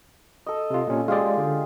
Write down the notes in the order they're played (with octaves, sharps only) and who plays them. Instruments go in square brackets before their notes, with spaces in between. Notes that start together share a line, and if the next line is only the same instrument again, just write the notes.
[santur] A4 D#5
[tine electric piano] C3 F4
A#2 C#4
[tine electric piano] G#3 D5 [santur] F4 G4 G#4
[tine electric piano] D3